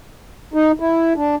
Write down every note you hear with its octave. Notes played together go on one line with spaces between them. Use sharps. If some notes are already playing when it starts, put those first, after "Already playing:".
D#4
E4
D4